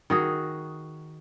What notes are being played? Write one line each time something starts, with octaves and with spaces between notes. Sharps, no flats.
D#3 F#4 G#4